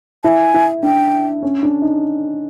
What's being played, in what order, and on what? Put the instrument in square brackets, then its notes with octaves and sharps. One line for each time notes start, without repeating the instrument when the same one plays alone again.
[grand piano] E4 [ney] G#5 A5
[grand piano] E4
[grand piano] D4 [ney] G5
[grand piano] C#4
D4
D#4